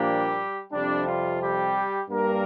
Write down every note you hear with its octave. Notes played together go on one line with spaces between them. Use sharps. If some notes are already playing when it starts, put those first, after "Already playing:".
Already playing: A#2 F3 G3 A#3 D4 G4
F2 C3 G3 D4
F4
G3 G4
G2 G3 A#3 D4 A#4